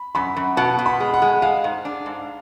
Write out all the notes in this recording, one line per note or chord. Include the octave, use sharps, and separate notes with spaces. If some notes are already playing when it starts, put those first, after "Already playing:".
Already playing: B5
F#2 B5
F#2
B2 A5
B2
B5
G#3
F#5
G#3
G#3 F5
G#2
D4
G#2